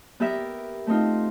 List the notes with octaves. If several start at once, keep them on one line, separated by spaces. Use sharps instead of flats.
B3 G4 A#4 E5
A3 C4 D#4 F4